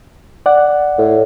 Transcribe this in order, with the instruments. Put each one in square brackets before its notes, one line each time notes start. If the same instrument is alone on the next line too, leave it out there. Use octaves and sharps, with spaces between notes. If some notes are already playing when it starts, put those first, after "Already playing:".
[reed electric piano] D5 F#5
[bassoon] A2